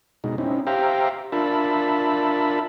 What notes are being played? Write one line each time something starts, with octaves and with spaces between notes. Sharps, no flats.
B2 G#3 D#4
C4 C#4 D#4 E4
G4 C5 E5 F5 G5 A#5
D4 F4 A#4 E5 A5 B5